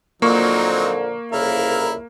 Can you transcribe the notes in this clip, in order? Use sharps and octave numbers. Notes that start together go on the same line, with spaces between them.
A#2 D3 F3 F#3 A#3 C4 D#4 C#6
C2 F2 C#3 E4 A#4 F5